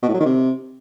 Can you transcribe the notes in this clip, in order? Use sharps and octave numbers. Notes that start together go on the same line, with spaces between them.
B2
A2
F#3
D#3
C3